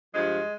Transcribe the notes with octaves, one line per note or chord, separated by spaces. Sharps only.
G2 F3 G#3